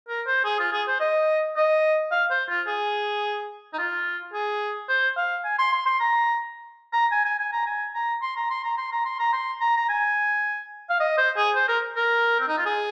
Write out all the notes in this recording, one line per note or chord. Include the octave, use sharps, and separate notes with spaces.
A#4
C5
G#4
F4
G#4
C5
D#5
D#5
F5
C5
F4
G#4
D#4
F4
G#4
C5
F5
G#5
C6
C6
C6
A#5
A#5
G#5
G#5
G#5
A#5
G#5
A#5
C6
A#5
C6
A#5
C6
A#5
C6
A#5
C6
A#5
A#5
G#5
F5
D#5
C5
G#4
C5
A#4
A#4
C4
D#4
F4
G#4